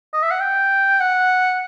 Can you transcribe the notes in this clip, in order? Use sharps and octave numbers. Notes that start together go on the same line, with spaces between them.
D#5
E5
F#5
G5
F#5